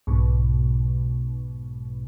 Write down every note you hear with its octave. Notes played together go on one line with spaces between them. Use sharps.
B1 G#2 B2